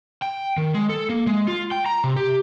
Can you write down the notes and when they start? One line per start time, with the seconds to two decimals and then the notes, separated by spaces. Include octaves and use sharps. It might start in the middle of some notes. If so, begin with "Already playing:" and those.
0.22 G5
0.57 D#3
0.74 G#3
0.89 A4
1.10 A#3
1.27 G#3
1.48 F4
1.72 G5
1.86 A#5
2.04 C3
2.16 G4